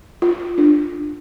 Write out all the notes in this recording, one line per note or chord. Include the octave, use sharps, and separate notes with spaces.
F4
D4